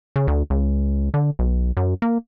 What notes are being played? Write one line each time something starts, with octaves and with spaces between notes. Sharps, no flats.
C#3
D2
C#2
D3
B1
F#2
A#3